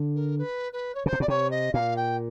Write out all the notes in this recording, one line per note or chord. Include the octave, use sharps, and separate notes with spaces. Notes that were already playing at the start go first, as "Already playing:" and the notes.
Already playing: D3
A#4
B4
B4
C#5
C#3 C5
C3
B2 D5
C3 C#5
D#5
A#2 F5
G5